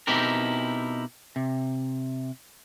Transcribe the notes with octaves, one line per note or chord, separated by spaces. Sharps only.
B2 C4 D#4 E4 G4 A#4
C3